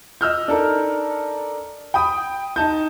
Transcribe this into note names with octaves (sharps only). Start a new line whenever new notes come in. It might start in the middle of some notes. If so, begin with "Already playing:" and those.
D#5 E6 F6 G6
D4 D#4 A4 A#4
G5 B5 D#6
D#4 A5 G6